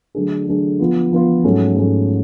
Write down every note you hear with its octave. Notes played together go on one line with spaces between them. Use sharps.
D3 F#3 A3 D4 G#4
D3 F#3 A3 D4 G#4
F3 B3 F4
F3 B3 F4
G#2 F#3 A3 C#4
G#2 F#3 A3 C#4